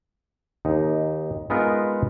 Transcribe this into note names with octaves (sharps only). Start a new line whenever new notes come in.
D#2 D#4
G#3 B3 D#4 F4 A#4 B4